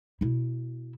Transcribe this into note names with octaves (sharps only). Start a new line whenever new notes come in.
B2 E4